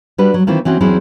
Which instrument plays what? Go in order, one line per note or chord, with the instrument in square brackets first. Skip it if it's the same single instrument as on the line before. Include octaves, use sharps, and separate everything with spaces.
[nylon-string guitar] G3 D4 F#4 B4
F#3
D#3 E3 A#3 C4 F4
E3 C4 C#4 F#4
E2 F#3 C4 C#4 E4 G#4